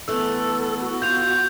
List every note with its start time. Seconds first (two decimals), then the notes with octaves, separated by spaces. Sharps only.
0.08 E3 A3 B3 A4 E6
0.81 F#4
1.02 F4 G6 F7